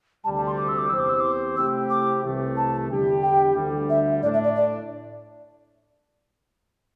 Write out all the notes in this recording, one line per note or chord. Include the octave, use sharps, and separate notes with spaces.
D2 C3 G3 A5
A5
C6
D6
E6
D6
E2 E3 C4 G4 C5 E6
D6
E6
D6
C3 A3 C4 E4 G4 E6
D6
C2 C3 E3 A3
A5
E2 D3 G3 E4 G4
G5
D2 D3 G3
E5
A2 A3 D4 D5
E5
D5
D5